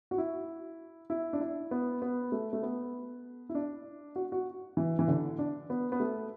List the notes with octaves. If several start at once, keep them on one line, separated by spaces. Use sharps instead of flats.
F#4
E4
E4
D4
E4
B3
B3
A3
A3
B3
E4
D4
F#4
F#4
E3
E3
D3
D4
B3
B3
A3